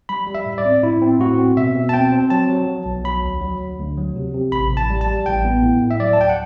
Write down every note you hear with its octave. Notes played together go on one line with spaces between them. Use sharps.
G3 B5
G3
E5
A2
D5
C4
A2 E4
C4
A2 F#4
C4
B2 E5
B2
A5
C4 G5
C4
F#3 A5
F#3
F#3
B1
F#3 B5
D2
F#3
D2
D2
F#3
C3
C3
A1 B5
A1
A5
G3
A5
G3
A1 G5
B3
A2
A2
E5
F#3 D5
A5
D2 G5
F#5